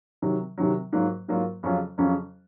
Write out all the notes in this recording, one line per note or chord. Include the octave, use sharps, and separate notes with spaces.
C3 D#3 F#3
C3 D#3 F#3
G#2 F#3 A#3 F4
G#2 F#3 A#3 F4
F2 C#3 F#3 C#4 F4
F2 C#3 F#3 C#4 F4